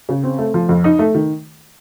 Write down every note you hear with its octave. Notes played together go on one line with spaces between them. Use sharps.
C#3
C4
A3
F3
F2
D#4
A3
D#3